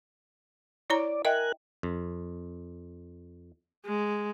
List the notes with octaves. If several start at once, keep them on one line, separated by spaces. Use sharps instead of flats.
E4 C#5 D5 A#5
A#4 D#5 E5 G5 G#5 F#6
F2
G#3